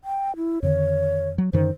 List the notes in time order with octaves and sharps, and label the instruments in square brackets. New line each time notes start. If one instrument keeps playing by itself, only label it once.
[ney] G5
E4
[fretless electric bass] F2 D3 D#3 [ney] C#5
[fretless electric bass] F#3
[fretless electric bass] F#2 D3 D#3 [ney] C5